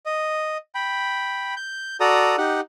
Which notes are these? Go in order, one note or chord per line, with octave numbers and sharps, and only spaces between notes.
D#5
G5 B5
G6
F#4 A4 D5 A#5 D#6
D#4 G4 F#5